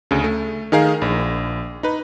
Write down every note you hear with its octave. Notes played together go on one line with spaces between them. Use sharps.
D2 C#3
A3
D#3 D#4 G#4 A#4 F5
A#1
D#4 B4